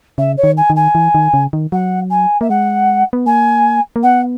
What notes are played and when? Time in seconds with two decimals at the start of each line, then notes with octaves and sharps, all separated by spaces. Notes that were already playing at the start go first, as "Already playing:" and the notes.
0.18 C#3 E5
0.37 C#5
0.44 D#3
0.57 G#5
0.70 D#3
0.76 G#5
0.95 E3
1.15 D#3
1.34 C#3
1.53 D#3
1.72 F#3 F#5
2.10 G#5
2.41 A#3 E5
2.49 G#3 F#5
3.13 B3
3.26 A#3 G#5
3.96 A#3
4.03 B3 F#5